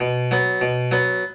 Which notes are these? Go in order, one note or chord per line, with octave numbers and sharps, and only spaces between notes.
B2
F#3 B3
B2
F#3 B3